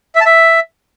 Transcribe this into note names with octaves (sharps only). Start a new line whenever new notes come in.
E5
A5
E5